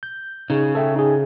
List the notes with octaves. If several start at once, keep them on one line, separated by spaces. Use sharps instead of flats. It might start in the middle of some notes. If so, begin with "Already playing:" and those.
G6
C#3 D#4 G#4
A4 E5 G5
D#4 G#4